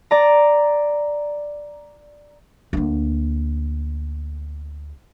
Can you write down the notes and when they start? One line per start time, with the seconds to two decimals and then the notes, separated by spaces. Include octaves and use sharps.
0.11 D5 A#5
2.73 D2 A#3